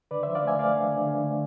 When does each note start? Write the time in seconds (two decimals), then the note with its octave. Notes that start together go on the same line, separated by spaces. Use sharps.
0.11 D3 B4 D5
0.23 F3 C5 E5
0.35 D5 F5
0.43 A3 E5 G#5
0.59 A3 D5 F5
0.76 D3
0.92 D3
1.07 D3
1.24 A3